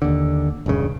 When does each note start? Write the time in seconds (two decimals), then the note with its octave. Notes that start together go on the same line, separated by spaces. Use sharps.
0.02 D#2 D3
0.66 E1 A1 G2 C#3